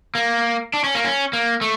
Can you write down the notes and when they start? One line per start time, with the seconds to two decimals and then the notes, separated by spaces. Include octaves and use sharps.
0.15 A#3
0.74 D4
0.84 C#4
0.95 A#3
1.04 C#4
1.33 A#3
1.61 A3